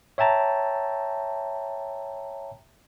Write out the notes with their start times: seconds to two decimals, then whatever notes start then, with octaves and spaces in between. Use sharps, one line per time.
0.18 C#5 E5 G5 A5 A#5